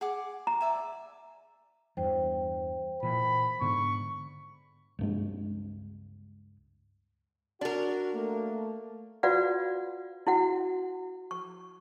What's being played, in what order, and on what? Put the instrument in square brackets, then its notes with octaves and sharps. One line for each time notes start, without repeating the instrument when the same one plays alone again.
[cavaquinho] G#4 F#5 D6
[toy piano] A#5
[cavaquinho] D5 E5 G#5
[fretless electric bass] E2 G2 [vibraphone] C5 G5
[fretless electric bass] A#2 E3 [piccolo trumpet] B5
[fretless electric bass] G#2 D3 B3 [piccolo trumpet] C#6
[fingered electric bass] C#2 G2 G#3
[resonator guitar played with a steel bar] D4 A#4 [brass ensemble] F#4
[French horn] A3 [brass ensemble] A#3
[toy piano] F4 F#4 B4 D5 F5 F#5
E4 F#4 F#5
C#6